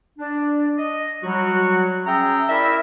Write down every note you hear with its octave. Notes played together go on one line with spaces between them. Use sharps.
D4
D#5
F#3 G3 F#4
C#4 G#4 E5 G5 A#5 E6
E4 A#4 D5 E5